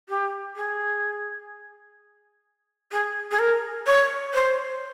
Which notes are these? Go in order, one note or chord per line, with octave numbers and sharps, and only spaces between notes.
G4
G#4
G#4
G#4
A#4
C#5
C5